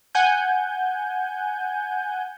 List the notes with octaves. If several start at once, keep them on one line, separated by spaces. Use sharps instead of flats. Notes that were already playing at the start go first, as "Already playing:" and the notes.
F#5 G#5 G6